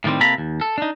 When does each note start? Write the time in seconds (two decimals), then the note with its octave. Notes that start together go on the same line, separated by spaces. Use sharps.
0.04 A2 D#3 G3 C4
0.21 C3 A#3 A4 A#5 B5
0.38 D#2
0.61 A4
0.78 D4 D#4